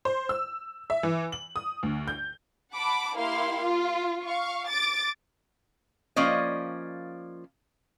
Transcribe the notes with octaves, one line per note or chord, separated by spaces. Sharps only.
C5
E6
E5
E3
F#7
D#6
D2
G6
F#5 A5 B5 D6
A#3 E4 G4 F5 C6
F4
F5 C#6
D6 A6 D7
F3 A#3 C#4 D5 D#5